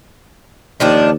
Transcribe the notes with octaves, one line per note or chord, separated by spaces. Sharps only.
D#2 D#3 F3 D4